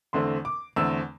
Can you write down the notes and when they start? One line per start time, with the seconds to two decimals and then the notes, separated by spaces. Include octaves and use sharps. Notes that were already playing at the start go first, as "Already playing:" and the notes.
0.13 E2 D3 A3 C4 C6
0.45 D6
0.76 E2 D3 A3 C4 E6